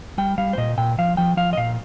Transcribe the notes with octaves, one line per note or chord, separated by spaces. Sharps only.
G3 G5
G3 F5
C5
A#2 D#5
A#2 G5
F3 F5
F3 G5
F3 F5
D#5
A#2 F5